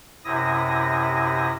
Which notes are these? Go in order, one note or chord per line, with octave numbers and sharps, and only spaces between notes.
F#2 C3 E4 D#6 A#6